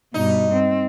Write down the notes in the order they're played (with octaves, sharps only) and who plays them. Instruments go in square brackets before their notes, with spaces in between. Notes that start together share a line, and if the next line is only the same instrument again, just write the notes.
[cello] G2 B2 [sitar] D#4
[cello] C4